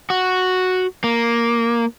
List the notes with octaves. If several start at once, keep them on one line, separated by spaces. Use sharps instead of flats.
F#4
A#3